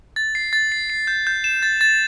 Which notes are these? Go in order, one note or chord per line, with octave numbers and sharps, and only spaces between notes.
A6
C7
A6
C7
C7
G6
G6
E7
A6
A6